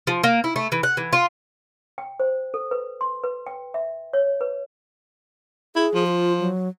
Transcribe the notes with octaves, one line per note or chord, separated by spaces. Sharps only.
F3
A#3
E4
A3
E3
F#5
E3
F4
G5
C5
A4
B4
C6
B4
G5
E5
C#5
B4
E4 G#4
F3
F4
F#3